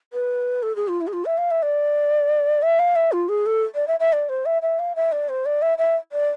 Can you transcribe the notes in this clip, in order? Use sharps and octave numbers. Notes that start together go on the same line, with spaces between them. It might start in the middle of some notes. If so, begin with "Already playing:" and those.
B4
A4
G#4
F4
E4
G#4
F4
E5
F5
E5
D5
E5
F5
E5
F4
G#4
A4
D5
E5
E5
D5
C5
E5
E5
F5
E5
D5
C5
D5
E5
E5
D5